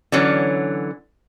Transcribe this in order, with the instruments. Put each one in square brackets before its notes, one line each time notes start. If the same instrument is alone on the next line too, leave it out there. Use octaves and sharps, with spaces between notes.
[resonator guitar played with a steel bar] D3 E3 F#3 C#4